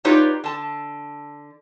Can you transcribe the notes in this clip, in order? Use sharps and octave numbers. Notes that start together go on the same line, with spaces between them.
D#4 F4 G4 B4 C#5 D5
D3 A5